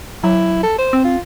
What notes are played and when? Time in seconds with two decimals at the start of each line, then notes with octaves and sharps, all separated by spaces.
0.24 F#3 E4
0.63 A4
0.78 C5
0.93 C4
1.05 F4